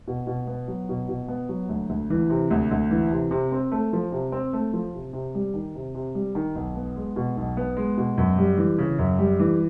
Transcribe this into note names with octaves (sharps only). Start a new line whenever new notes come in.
B2
B2
B3
F#3
B2
B2
B3
F#3
D2
D2
E3
C3
D2
D2
E3
C3
C3
C4
A3
F3
C3
C4
A3
F3
C3
C3
G3
D#3
C3
C3
G3
D#3
B1
B3
G#3
B2
B1
B3
G#3
B2
F#2
G3
E3
C#3
F#2
G3
E3